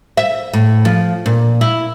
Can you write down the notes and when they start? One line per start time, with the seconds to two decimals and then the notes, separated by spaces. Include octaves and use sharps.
0.17 E5
0.53 A2
0.85 F3
1.26 A#2
1.61 E4